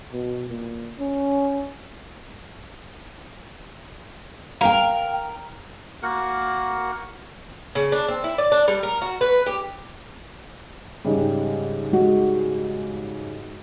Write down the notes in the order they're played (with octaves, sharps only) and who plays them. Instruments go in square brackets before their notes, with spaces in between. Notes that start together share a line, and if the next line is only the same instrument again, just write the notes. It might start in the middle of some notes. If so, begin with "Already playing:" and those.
[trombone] B2
A#2
C#4
[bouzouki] A#4 [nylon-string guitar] F5 G5
[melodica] A#3 F#4 A#4 F#5
[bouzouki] C#3
D4
C4
E4
D5
D4
G3
A#4
F#4
B4
G4
[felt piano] G#2 C#3 G3
[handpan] G#3 F#4